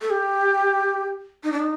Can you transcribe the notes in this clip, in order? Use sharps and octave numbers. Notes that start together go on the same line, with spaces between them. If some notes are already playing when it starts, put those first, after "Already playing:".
A4
G4
D#4
D4
D#4